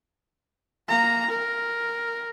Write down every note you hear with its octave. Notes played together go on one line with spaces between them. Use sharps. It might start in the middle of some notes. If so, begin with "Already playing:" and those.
A#3 A#5
A#4